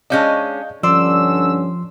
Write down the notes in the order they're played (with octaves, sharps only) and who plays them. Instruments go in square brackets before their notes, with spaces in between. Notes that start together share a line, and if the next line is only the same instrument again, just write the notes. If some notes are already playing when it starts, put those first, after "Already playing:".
[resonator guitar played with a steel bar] G#3 C#4 D4 [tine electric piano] D#5 F5 G6
[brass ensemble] G2 D3 C#4 [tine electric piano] F3 C6 [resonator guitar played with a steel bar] D5 [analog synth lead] E6